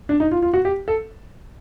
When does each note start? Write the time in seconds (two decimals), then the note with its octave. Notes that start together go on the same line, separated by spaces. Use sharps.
0.09 D4
0.20 D#4
0.31 F4
0.42 F4
0.54 F#4
0.65 G4
0.88 A4